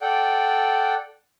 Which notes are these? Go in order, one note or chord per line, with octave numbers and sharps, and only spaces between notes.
A4 D5 F#5 G5